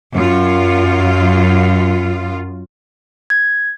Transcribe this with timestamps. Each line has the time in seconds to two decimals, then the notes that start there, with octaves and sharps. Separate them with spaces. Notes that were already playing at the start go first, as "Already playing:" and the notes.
0.14 F#2 F4
3.30 G#6